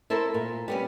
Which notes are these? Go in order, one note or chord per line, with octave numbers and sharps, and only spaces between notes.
E4 A4 A#4 C5
A#2
G3 B3 C#4